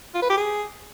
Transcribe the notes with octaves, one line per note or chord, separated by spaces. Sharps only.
F4
B4
G4
G#4